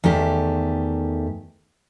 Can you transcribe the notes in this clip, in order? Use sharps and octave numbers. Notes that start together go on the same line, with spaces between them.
E2 D#3 A3 G4